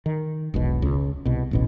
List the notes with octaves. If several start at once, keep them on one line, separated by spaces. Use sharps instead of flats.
D#3
E1 B1 B2
C#2
C2 B2
D1 A1 B2